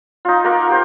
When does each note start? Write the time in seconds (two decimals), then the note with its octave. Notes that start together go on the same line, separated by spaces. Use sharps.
0.25 D#4 F4
0.44 A#3 F4 A#4 F#5
0.70 G4 C5 G5